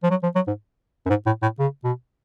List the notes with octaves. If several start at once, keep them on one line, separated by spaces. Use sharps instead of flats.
F3
F#3
F3
F#3
G#2
F#2
G#2
A2
A2
C#3
B2